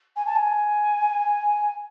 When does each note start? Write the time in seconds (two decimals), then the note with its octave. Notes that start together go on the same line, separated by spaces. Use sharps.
0.16 G#5
0.26 A5
0.35 G#5